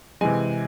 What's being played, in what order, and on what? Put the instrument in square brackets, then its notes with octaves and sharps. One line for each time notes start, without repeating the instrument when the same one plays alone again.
[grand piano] C3 E3 G#3 G#5